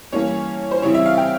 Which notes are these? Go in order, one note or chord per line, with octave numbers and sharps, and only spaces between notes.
G2 E3 A#3 C#4 C#5
C5
C#3 E3 G3 C4 E4 C#5
E5
F5
G5